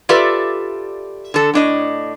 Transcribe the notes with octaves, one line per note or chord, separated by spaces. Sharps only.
F4 G4 A4 B4 D5 E5
D3 A4
A2 D4 D#5